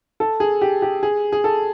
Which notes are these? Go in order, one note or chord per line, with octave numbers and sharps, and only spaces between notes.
A4
G#4
G4
G4
G#4
G#4
A4